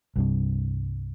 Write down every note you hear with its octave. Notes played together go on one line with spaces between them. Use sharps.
C2 G2 C3